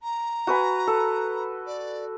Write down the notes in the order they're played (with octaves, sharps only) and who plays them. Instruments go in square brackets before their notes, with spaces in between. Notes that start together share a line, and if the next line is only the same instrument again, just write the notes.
[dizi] A#5
[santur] F#4 B4 G#5
A4
[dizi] D5